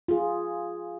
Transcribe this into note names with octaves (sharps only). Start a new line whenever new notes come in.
F4 G#4